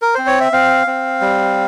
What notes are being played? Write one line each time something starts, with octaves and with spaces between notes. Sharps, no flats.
A#4
C4 C5
C#5
E5
C4 F5
C4
G3